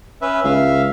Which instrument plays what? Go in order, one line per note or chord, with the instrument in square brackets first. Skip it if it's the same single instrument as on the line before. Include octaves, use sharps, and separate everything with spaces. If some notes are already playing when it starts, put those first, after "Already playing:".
[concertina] C#4 B4 E5
[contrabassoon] C#2 [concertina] E5 F5